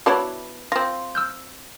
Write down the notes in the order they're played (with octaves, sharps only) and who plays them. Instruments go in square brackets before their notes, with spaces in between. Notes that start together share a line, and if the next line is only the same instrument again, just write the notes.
[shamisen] B3 D4 E4 [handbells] F#4 B4 C#5
[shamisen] C4 F4 [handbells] A#6
[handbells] E6 F6 G6